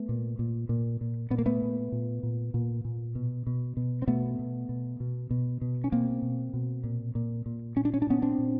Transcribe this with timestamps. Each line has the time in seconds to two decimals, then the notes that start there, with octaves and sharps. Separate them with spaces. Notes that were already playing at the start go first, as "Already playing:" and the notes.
Already playing: A3 B3
0.09 A#2
0.39 A#2
0.69 A#2
1.01 A#2
1.30 A#2 B3
1.38 A#3
1.46 A3 B3
1.62 A#2
1.92 A#2
2.23 A#2
2.54 A#2
2.85 A#2
3.15 B2
3.47 B2
3.77 B2
4.02 C4
4.07 B2 A3 B3
4.39 B2
4.69 B2
5.00 B2
5.31 B2
5.61 B2
5.84 C#4
5.92 B2 A#3 C4
6.22 B2
6.54 B2
6.84 A#2
7.15 A#2
7.46 A#2
7.76 A#2 C#4
7.85 D4
7.94 C#4
8.02 D4
8.07 A#2 B3 C#4
8.22 C4 D4
8.38 A#2